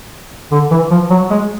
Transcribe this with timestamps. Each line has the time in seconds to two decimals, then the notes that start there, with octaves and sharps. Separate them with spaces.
0.52 D3
0.71 E3
0.91 F3
1.10 F#3
1.31 G#3